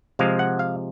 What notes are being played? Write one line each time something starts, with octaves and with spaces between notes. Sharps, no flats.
C3 F3 G#3 F5
F#5
F5